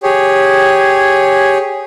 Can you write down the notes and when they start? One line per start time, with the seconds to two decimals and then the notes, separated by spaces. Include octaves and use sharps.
0.03 G4 G#4 C#5